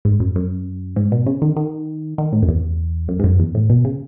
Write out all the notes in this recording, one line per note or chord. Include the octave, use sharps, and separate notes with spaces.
G#2
F#2
F#2
G#2
B2
C#3
D#3
D#3
D#3
A2
F#2
E2
F#2
G#2
F#2
E2
A2
B2
C#3